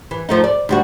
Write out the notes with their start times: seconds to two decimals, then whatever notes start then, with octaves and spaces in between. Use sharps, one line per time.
0.11 E3
0.29 F3 A3 D#4
0.44 D5
0.69 D2 G3 F#4